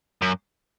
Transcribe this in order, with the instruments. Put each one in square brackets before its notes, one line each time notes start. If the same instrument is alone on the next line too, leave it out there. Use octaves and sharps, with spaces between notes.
[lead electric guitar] F#2